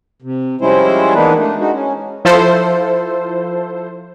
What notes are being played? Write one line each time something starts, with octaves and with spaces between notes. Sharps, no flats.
C3
F3 G3 G#3 C#4 E4 C5
E3 A#3 B3 D4 D#4 B4
A3 D4
G#3 D#4 F#4
C#4
F3 E4 F4 A4 C5